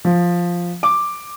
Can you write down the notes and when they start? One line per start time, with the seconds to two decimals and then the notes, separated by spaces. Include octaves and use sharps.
0.05 F3
0.83 D6